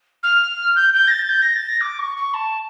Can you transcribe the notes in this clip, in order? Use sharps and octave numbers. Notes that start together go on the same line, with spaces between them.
F6
G6
G6
A#6
A6
G6
A#6
A6
A#6
D6
C#6
C#6
A5